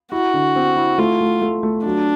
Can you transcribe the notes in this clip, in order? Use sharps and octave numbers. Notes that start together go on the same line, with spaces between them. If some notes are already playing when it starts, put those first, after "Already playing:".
E4 F#4
D3
C4
E4
A3 F4
A3
A3
A3
F#3 D4